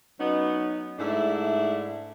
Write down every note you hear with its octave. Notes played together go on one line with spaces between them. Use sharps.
F#3 B3 C#4 D#4
G#2 A3 D4 E4